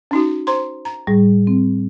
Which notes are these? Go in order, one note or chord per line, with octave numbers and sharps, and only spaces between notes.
C#4 D#4 F#4
C5 A#5 C6
A#5
A2 G3 G#4
C4